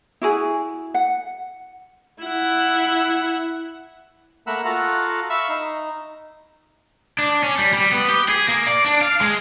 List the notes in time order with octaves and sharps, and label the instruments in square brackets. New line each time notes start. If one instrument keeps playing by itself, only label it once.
[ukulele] E4 F#4 G#4
F#5
[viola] E4 F#5
[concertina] A3 A#3 A#4 F#5 B5 E6
F4 F#4 A4 F#5 A#5
E5 F5 B5 C#6 E6
D#4
[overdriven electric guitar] D4
C#4
G3
G3
B3
G4
G#4
A#3
D5
D4
F5
G#3